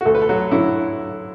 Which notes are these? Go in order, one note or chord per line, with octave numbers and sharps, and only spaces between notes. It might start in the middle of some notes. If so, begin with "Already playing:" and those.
F#4
D2 A3 A4
B4
A4
F#3 F#4
D3 F#3 E4